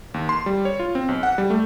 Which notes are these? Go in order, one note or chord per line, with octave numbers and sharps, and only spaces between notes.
D#2
C6
G3
C#5
F4
C4
B1
F#5
G3
A3